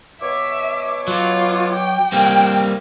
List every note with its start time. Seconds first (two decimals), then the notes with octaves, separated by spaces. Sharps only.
0.22 B2 C#5 E5 D6
1.08 F#3 F4
1.74 G5
2.12 G3 A#3 C4 G5